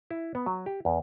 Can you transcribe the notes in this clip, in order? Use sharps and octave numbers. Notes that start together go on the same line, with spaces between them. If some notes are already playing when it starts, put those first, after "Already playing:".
E4
B3
F#3
G4
E2